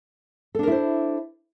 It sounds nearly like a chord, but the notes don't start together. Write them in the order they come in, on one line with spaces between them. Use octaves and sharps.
A4 D4 A#4 E4 C5